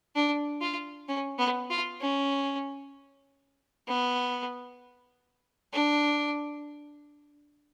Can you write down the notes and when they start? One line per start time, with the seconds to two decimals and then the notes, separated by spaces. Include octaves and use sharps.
0.15 D4
0.61 F4
1.08 C#4
1.38 B3
1.70 F4
2.01 C#4
3.87 B3
5.73 D4